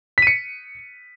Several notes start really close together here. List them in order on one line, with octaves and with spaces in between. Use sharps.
B6 D#7 C#7